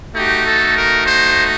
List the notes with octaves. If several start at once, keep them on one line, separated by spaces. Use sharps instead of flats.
A3 D#4 F#4 G4
A4
A#4
C5